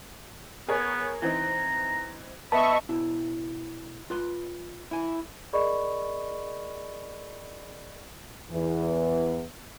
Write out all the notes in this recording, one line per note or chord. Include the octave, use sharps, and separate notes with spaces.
B3 G#4 A#4 C#5
E3 C4 D#4 A#5
B3 D#5 E5 A5 B5 C#6
B2 E4
F4 B4 C6
E4 G#5
G#4 A#4 D5 D#5 B5 C#6
E2 E3